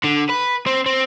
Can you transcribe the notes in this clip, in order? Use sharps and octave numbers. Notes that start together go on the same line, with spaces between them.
D3
B4
C4
C4